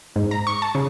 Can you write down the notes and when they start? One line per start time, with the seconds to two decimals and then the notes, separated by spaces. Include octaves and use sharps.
0.16 G#2
0.31 A#5
0.47 C#6
0.62 A5
0.75 C#3